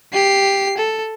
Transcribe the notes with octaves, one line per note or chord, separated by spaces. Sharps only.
G4 C7
A4